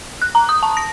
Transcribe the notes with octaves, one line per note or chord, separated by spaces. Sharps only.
F#6
A#5
D#6
A5
A#6